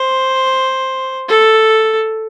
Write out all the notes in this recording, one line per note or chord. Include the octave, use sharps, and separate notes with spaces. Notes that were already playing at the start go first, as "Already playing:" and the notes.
Already playing: C5
A4